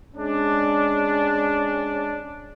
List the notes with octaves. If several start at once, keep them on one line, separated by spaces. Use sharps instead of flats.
G#3 C#4 D4